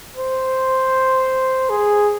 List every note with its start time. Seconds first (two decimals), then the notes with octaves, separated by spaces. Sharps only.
0.17 C5
1.70 G#4